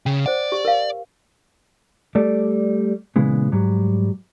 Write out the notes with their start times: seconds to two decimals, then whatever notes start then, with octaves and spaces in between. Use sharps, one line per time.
0.06 C#3 G5
0.26 C5 D5 F#5
0.52 G4
0.65 A#4 F5
2.15 G3 A3 A4 D5
3.16 A#2 C#3 E3 G#3 B3
3.52 G#2 F#3 G3